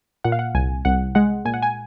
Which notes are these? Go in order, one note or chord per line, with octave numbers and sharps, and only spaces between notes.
A#2 F#5
F5
F#5
C2 G#5
C2 F#5
G#3 F#5
A#2 G#5
F#5
G#5